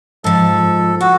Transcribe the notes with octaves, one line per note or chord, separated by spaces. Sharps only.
G#2 F3 A4
F#4 A4